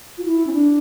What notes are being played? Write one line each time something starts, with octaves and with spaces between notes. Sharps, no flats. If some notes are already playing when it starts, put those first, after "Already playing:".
F4
E4
C#4
D4